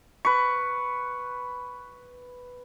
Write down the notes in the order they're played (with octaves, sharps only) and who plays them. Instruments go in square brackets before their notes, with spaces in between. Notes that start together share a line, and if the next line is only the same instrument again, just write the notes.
[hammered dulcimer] B4 C#6